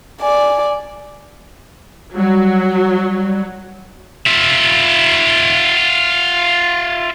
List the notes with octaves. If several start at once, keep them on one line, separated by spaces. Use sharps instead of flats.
D5 G#5
F#3 G3
F4 E5